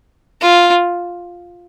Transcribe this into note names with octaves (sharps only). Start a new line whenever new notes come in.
F4